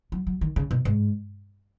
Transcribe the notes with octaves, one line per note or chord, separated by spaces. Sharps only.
F#3
F#3
D#3
C#3
B2
G#2